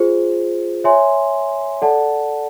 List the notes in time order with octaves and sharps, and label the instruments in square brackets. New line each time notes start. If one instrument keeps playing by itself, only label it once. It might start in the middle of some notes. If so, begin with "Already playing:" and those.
Already playing: [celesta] F4 G#4 C5
C#5 E5 G#5 C6
A4 D5 F#5 A5